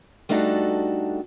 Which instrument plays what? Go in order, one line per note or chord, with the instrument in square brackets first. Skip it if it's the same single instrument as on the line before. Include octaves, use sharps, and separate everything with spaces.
[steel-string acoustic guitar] G3 A3 D4 D#4 F#4 A4